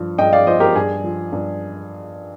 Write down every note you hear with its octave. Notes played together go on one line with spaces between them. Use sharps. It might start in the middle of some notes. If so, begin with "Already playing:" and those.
Already playing: G2 F3
G2 D#5 G5
D5 F5
F3 C5 D#5
G4 A#4
G2 G#4
F3
G2